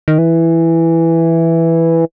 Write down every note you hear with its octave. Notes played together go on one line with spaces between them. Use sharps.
D#3
E3